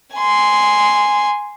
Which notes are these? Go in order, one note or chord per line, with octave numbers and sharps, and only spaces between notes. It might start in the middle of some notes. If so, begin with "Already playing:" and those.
G#5 C6